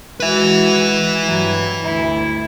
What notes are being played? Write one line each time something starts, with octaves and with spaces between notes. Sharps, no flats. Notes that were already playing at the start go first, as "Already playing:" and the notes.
G#3 F#4 B4 E5
G2 F#3
D2 E4